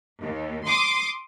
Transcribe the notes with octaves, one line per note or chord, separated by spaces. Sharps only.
D#2
C6 D6 D#6